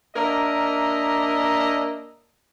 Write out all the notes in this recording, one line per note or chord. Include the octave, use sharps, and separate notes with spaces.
A#3 D4 A#4 D#5 E5